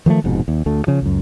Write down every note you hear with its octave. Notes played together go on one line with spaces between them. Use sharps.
D#3 F3 G3 A3
F1 F2 G#2 B2
D#2
D2 A3
C#3 F3
C#2 F#2